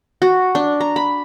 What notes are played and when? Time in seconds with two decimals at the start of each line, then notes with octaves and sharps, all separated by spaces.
0.22 F#4
0.55 D4
0.81 A#5
0.96 B5